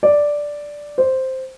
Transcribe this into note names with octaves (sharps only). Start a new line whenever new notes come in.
D5
C5